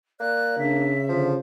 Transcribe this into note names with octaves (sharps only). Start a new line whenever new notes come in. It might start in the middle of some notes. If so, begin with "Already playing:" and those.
A#3 D5 F#6
C#3 D4 E5
D3 F3